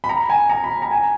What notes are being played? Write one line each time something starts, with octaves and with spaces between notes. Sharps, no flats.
B5
A#5
G#5
A#5
B5
A#5
G#5